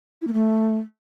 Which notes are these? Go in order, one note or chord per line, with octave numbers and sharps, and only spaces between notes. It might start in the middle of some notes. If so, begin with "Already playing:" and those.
E4
A#3
A3